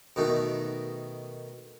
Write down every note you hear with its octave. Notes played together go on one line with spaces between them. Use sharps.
B2 D#3 A3